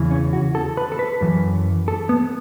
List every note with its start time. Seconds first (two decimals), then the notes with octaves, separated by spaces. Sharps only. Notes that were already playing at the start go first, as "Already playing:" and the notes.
Already playing: E2 C#3 E3
0.11 C#4
0.33 F#4
0.55 A4
0.77 B4
0.92 A4
0.99 B4
1.21 F#2 E3
1.88 A4
2.09 B3